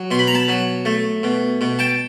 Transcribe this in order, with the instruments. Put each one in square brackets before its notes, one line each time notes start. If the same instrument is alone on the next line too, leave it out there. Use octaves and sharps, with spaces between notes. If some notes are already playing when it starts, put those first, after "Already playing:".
Already playing: [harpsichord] F#3
B2 C6
B5
A#5
A5 B5
F#3
A3
B2
B2
G5 A5